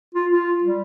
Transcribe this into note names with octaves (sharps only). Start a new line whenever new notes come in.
F4
F4
G3